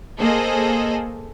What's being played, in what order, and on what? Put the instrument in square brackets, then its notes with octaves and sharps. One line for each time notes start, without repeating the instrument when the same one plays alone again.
[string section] A#3 G#4 A4 C5 D#5